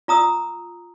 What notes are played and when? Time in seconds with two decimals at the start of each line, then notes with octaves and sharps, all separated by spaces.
0.08 F4 A#5 D#6 E6